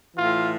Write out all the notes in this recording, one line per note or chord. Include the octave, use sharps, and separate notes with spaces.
A2 E3 F4